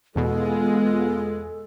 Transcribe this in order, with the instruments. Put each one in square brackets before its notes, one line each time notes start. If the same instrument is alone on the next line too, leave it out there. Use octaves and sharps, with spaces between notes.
[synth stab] E2 B2 [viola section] G#3 [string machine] B3 F4 [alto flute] A4